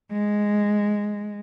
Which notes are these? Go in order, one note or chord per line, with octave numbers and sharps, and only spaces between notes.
G#3